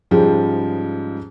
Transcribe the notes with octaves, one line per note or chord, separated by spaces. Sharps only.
G#2 C#3 F3 G3 G#3